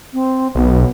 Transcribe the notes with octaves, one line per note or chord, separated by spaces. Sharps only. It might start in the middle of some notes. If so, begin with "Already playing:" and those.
C4
B1 B3